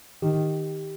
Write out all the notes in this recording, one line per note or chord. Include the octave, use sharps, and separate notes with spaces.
D#3 G4